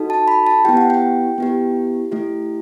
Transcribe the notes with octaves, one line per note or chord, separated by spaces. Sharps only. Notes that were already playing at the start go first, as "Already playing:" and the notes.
Already playing: D#4 F#4 A4
A5
B5
A5
B3 E4 G4 G5
F#5
G5
B3 E4 G4
A3 E4 G4